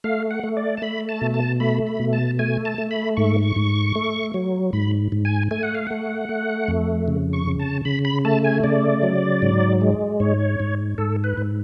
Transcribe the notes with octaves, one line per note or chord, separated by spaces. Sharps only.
A3 F5
F#5
A3
D5
A5
A3 B5
A5
B2
A5
A3 B5
B5
B2
A5
A3 G#5
A5
A3
B5
G#2 C#6
G#2
A3
F#3
G#2 B5
G#2
G#5
A3 G#5
F#5
F5
A3 F#5
A3
F2
C#3
C#6
C#3
A5
C#3 B5
B5
A3 A5
G#5
C#3 D5
F#3
G#2
G#3
G#2 C#5
G#2
G#2 A4
B4
G#2